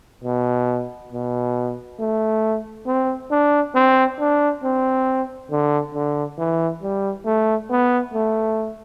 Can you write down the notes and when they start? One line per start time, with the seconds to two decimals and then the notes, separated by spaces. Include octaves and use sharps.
0.24 B2
1.12 B2
1.99 A3
2.87 C4
3.30 D4
3.75 C4
4.19 D4
4.63 C4
5.50 D3
5.94 D3
6.38 E3
6.82 G3
7.25 A3
7.70 B3
8.13 A3